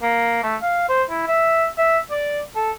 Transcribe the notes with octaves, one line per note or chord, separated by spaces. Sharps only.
A#3
A3
F5
C5
E4
E5
E5
D5
A4